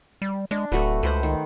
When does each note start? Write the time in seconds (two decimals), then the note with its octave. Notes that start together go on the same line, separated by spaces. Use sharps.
0.22 G3
0.51 G#3 D4
0.72 D1 A3 F#4 B4
1.03 C#2 B4 C5 F#5
1.23 D#3